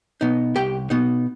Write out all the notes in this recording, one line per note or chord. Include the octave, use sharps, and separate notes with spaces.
B2 B3 D#4
C2 G4 G5
B2 B3 D#4